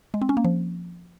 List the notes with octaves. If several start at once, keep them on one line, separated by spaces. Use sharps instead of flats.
G#3
C4
C#4
A#3
F3